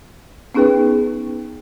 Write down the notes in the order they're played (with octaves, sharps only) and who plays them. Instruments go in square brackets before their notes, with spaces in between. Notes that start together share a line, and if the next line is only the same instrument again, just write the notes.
[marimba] B3 C#4 D#4 G#4 B4 G5